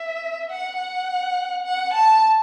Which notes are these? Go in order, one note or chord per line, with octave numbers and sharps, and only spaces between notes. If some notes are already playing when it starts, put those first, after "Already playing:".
Already playing: E5
F#5
F#5
F#5
A5